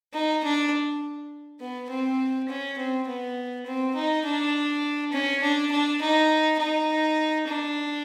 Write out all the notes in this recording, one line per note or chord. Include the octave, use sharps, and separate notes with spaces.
D#4
D4
B3
C4
C#4
C4
B3
C4
D#4
D4
C#4
D4
D4
D#4
D#4
D4